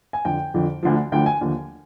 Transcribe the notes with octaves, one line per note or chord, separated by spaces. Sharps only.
G#5
F2 D3 F3 G5
F2 D3 F3
D2 D3 F3
D2 D3 F3 G5
G#5
D#2 D3 F3